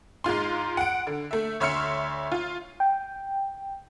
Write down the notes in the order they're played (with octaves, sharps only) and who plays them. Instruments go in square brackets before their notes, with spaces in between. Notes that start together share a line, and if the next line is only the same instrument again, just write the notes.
[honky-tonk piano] G#2 G#3 F4 C6
F#5 D7
D3
A3 E5
D2 C#5 E5 C6 F6 C#7
F4
[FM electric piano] G5